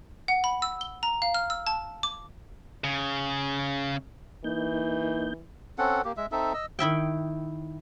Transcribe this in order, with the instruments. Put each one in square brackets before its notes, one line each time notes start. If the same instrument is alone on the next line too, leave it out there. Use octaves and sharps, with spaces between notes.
[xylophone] F#5
B5
E6
G7
A#5
F5
F6
E6
A5
D6
[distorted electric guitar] C#3
[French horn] E3 [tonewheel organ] A#3 D#4 G6
[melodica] C4 C#4 A4 F#5
A#3 G4
G#3 E5
C4 D#4 A4 E5
D#5 E6
[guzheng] D#3 E4 E5 G5